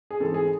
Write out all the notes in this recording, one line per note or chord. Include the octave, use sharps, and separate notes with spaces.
G#4
G#2 E3 C4 A4
G#4